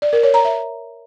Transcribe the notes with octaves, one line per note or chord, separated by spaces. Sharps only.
D5
A#4
C#5
A#5
E5